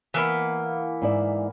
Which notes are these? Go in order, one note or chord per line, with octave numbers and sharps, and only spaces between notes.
E3 A#3 B3
G#2 E4 D5